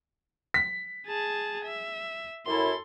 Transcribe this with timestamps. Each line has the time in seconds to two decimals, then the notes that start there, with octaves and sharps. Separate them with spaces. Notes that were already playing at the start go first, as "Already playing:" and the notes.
0.54 B6
1.06 G#4 A5
1.66 E5
2.47 F#2 E4 A4 C6